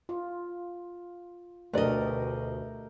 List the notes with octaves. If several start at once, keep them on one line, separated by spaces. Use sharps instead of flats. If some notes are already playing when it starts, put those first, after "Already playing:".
F4
D2 B2 A3 G4 A#4 B4 D5 D#5